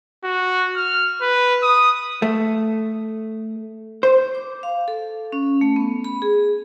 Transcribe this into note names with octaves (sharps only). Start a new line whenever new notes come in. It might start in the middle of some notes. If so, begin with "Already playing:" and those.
F#4
F6
B4
D#6
A3
C5
D6
F5
A4
C#4
A3
B3
B5
G#4